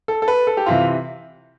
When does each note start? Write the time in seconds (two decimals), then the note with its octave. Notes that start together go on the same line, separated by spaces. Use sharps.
0.08 A4
0.22 A4
0.28 B4
0.47 A4
0.57 G4
0.66 C3 E3 F4